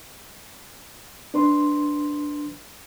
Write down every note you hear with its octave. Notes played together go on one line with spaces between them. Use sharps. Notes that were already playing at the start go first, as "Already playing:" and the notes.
D4 B4 C6